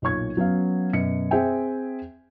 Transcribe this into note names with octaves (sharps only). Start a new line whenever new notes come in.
B1 A#2 C#5 C#6 G#6
F#3 B3 C#4 F5
F#2 B2 C#7
C4 G#4 C5 E5 G5 G#5